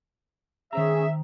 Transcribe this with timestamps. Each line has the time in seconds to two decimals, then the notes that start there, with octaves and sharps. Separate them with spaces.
0.73 D#3 C#4 G#4 C5 E5 A#5